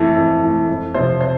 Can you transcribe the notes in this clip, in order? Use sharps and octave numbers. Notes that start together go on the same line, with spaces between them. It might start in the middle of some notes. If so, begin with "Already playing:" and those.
Already playing: F2 E3 A3
F2
E3 A3
F2
C3 F3 C5
C5